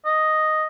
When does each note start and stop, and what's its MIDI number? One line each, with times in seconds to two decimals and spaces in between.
0.05 0.67 75